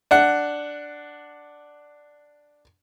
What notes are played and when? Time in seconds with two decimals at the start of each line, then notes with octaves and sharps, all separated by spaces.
0.11 D4 F#5